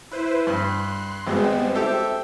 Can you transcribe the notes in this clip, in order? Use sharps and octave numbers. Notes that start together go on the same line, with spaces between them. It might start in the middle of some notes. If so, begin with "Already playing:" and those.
E4 B4 C5
G2 C6 F#6
G#1 G3 G#3 B3 C4
G4 A4 C5 E5